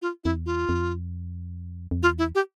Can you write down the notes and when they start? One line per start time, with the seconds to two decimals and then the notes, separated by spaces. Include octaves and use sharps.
0.02 F4
0.24 F2 E4
0.35 E2
0.46 F4
0.69 F2
1.91 F2
2.02 E2 F4
2.18 E4
2.35 G4